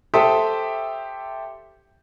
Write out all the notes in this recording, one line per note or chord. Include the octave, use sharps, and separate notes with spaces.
G4 A4 C5 E5 G5 D#6